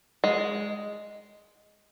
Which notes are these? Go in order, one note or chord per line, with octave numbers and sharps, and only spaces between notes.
G#3